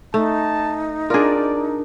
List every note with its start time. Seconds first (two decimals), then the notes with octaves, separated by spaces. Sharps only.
0.14 A3 D#4 A5
1.10 D4 F4 G#4 A#4 D5